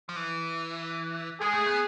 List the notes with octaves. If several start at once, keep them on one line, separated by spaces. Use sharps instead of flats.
F3
E3
G#3 G#4
A3
B3